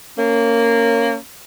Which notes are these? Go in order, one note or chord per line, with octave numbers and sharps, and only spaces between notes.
A#3 C#4